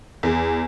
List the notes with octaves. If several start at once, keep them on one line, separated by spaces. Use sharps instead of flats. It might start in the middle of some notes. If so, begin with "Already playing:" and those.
E2